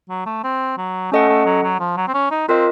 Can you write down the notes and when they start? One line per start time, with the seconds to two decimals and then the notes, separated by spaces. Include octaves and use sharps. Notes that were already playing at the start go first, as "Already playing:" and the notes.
0.10 F#3
0.26 A3
0.44 C4
0.78 F#3
1.12 A3 C#4 A4 D#5 F#5
1.29 A3
1.46 F#3
1.64 F#3
1.80 F3
1.97 F#3
2.08 C4
2.14 C#4
2.31 D#4
2.49 C4 F4 A#4 D#5